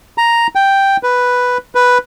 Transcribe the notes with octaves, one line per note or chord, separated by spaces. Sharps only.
A#5
G5
B4
B4